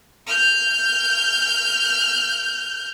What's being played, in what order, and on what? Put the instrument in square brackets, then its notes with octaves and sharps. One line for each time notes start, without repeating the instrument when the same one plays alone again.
[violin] F6 G6